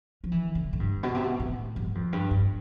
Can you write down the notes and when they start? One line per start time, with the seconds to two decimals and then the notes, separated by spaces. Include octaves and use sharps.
0.24 F3
0.32 E3
0.55 D3
0.73 A2
0.80 G2
1.03 B2
1.14 C3
1.24 B2
1.40 A2
1.76 G2
1.95 F2
2.13 G2
2.31 G2